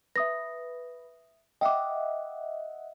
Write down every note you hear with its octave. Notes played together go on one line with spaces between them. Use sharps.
B4 E5 D#6 A#6
D#5 E5 F#5 G5 D6